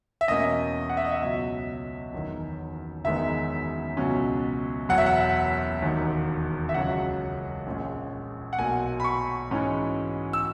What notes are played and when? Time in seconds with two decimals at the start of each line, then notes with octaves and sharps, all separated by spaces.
0.21 E5
0.28 E2 B2 A#3 C#4 D#5
0.90 F#5
0.97 E5
1.05 D#5
1.12 E5
1.20 C#2 B2 F#3
2.13 F#1 E2 D#3
3.04 F#1 E2 D#3 G#3 B3 E5
3.97 C#2 B2 F#3 C#4
4.89 F#1 E2 B2 F#3 F#5
4.98 E5
5.06 F#5
5.82 E1 D#2 D#3
6.69 E5
6.74 C#2 C#3 F#3 F#5
7.66 A#1 A#2 G#3 C#4
8.53 F#5
8.58 B1 B2 A#3 G#5
9.00 B5
9.04 C#6
9.51 G#2 E3 G#3 C#4
10.33 E6